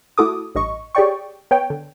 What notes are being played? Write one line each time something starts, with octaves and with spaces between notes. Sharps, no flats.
A3 E4 F#4 A4 D6 D#6
A1 G2 D#5 C#6
G4 G#4 C#5 D5 G5 C#6
B3 C#5 G5
D3